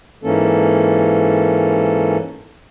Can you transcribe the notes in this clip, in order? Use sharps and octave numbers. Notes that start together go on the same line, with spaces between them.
G#2 E3 A#3 C#4 A4